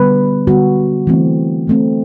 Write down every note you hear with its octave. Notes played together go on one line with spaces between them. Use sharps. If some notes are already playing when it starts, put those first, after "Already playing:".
Already playing: D3 G3 B3 B4
D3 G3 B3 F#4
E3 A3 C4
E3 A3 C4